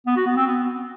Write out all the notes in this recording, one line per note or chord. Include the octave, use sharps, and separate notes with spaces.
B3
F#4
B3
C4
B3